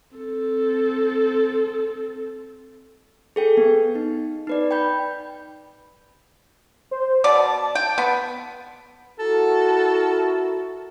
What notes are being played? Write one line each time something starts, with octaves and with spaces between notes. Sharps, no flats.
C4 A4
G#4 A4 G5
B3
D#4
D#4 B4 D5
G5 B5 G6
C5
B2 D5 A5
G5
B3
E4 F#4 A4 A#4